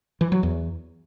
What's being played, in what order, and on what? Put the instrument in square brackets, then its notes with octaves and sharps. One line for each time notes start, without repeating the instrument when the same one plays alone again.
[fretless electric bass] E3
F#3
E2